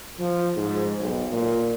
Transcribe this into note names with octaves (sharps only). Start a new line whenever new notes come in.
F3
G#2
B1
A#2